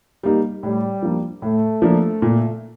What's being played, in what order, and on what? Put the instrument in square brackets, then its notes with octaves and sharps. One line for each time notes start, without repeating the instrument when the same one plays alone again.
[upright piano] G3 A#3 D#4
[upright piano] A2 [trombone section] G3
[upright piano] F3 A#3 D4
[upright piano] A2 [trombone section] A3
[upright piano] F3 A#3 D4
A#2